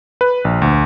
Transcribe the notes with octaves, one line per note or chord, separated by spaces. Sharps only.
B4
A#1
D2